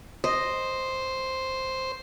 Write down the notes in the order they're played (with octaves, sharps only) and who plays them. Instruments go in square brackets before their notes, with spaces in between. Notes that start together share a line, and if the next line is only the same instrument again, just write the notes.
[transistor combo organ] C5 [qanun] D#5